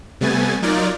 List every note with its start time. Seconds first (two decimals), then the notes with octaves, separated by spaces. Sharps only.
0.21 C3 G3 A3 B3 G#5 A6
0.62 F#3 D#4 F4 A#4 D5